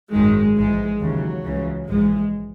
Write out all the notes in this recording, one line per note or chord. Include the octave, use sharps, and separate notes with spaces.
G#1 F#2 D#3 G#3
A#1 G#2 E3 G#3
D#2 C#3 E3 F#3
C#2 C#3 E3
A#1 G#2 E3 G#3